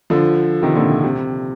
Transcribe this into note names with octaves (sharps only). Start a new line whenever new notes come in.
D3 F3
C3 D#3
A#2 D3
C3
C3